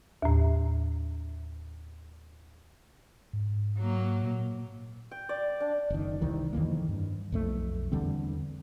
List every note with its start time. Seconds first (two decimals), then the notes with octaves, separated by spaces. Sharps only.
0.22 D#2 A2
3.33 G#2
3.78 F#3 A#3
4.23 A#2
5.11 G5
5.29 D5
5.60 D4
5.90 F#1 D#3
6.21 C2 D#3 E3
6.53 F2 D#3 E3 A#3
6.89 G2
7.32 B1 F2 A3
7.92 E2 D3 G3 C4